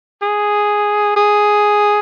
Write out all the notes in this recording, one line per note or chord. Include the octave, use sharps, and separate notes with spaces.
G#4
G#4